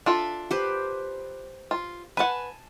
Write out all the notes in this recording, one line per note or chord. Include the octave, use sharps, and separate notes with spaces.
D4 F4 A4 E5
G4 B4 C5
F4
B4 F#5 G#5 A5